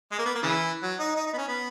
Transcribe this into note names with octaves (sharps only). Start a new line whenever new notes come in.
G#3
A#3
B3
A#3
C#3 E3
F#3
D#4
D#4
D#4
B3
C#4
B3